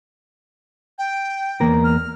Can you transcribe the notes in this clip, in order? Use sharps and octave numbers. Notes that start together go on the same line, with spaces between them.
G5
E2 A#3 A#4
F6